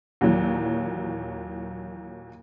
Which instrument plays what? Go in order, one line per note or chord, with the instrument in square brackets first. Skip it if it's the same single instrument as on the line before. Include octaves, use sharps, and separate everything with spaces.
[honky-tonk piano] D#2 A#2 E3 F#3